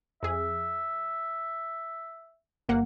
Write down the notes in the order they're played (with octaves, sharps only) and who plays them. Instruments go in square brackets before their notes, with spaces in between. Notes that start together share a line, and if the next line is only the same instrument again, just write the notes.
[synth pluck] F2 G#4 [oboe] E5
[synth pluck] G1 A#3 F#5